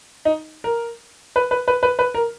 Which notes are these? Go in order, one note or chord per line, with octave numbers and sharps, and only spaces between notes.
D#4
A#4
B4
B4
B4
B4
B4
A#4